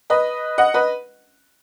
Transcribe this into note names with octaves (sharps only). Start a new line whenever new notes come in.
B4 D#5
D#5 F#5
B4 D#5